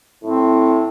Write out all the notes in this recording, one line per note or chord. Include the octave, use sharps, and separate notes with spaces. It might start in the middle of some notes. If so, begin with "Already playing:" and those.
A2 C4